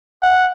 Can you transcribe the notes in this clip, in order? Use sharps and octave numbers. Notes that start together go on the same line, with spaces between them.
F#5